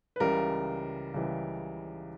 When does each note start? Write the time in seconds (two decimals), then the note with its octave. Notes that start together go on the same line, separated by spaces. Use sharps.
0.16 B4
0.20 C#2 C#3 E3 G3 A#4
1.14 C#2 C#3 E3 G3